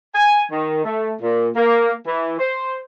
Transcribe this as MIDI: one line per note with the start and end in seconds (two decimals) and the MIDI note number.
0.15 0.42 80
0.51 0.82 51
0.85 1.14 57
1.22 1.48 46
1.56 1.93 58
2.07 2.38 52
2.39 2.79 72